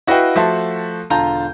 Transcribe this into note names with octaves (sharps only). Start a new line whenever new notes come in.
E4 F#4 B4 D#5 F5 G5
F3 A3 F#4 E5 A5 C6
E1 D3 F4 A5 A#5 G6